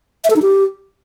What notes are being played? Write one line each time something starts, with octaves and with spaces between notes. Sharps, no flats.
E5
A4
D#4
G4